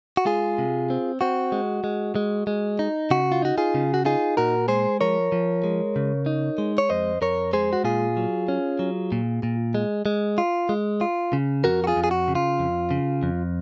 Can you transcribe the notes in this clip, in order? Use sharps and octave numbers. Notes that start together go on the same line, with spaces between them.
F#4
G#3 F4 G#4
C3
C4
C4 F#4
G#3
G#3
G#3
G#3
D#4
C#3 F#4
F4
D#4 F#4
F4 G#4
C#3
F#4
D#4 F4 G#4
A#2 F#4 A#4
G#3 G#4 C5
F3 A#4 C#5
F3
G#3
C#3
D#4
G#3
C#5
F2 C5 D#5
F2 A#4 C#5
G#3 G#4 C5
F#4
A#2 F4 G#4
F#3
C#4
F#3
A#2
A#2
G#3
G#3
F4
G#3
F4
C#3
F2 F#4 A#4
F#4
F4 G#4
F2
G#4
F#4
C#3
F4
F2
C#3
F2